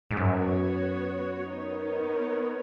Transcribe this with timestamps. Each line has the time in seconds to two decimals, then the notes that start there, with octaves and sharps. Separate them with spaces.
0.11 G#2
0.16 F#2 B3 F#4 C#5
1.52 B3 D#4 A#4 C#5